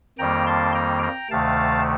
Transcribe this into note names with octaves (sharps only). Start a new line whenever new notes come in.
F2 D#3 G3 A#3 G5 A#5
A5 C6
G5 A#5
G5 A#5
D2 C3 D#3 A3 F5 A5